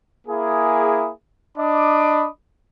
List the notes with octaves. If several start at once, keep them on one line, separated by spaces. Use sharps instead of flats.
A#3 E4 G#4
D4 D#5 B5 D6 D#6